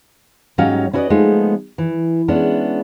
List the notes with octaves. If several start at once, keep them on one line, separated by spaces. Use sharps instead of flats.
G#2 F#3 C#4 G4 D#5 F5
C#4 E4 F#4 B4 D5 D#5
F3 G#3 A3 B3 D#4
E3
G#3 B3 C#4 D4 E4